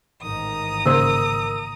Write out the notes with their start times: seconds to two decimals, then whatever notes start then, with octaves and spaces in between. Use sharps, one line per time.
0.22 A1 G#2 D#3 A#5 D#6
0.86 C#3 A#3 A#4 C5 E6